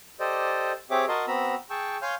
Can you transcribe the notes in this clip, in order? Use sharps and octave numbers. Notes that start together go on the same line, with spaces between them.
G4 A4 C5 D5 D#5
C4 G4 G#4 C#5 E5 D6
F#4 A#4 D#5 A5 C6
B3 C4 F#4 A#5 B5 E6
G#4 G5 A5 C#6 E6
C#5 F5 G#5 C6 F6 G6